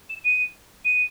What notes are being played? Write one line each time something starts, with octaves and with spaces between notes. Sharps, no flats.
E7
D#7
D#7